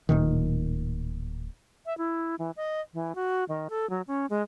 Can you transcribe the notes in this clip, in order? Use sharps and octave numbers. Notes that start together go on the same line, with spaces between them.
D1 A#2 D#3
E5
E4
E3
D#5
E3
F#4
D#3
A4
F#3
C#4
G#3